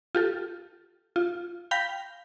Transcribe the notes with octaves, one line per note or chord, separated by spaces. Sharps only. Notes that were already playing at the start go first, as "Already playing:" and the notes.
F4 G4 A4
F4
F5 G5 B5 G6 A#6 B6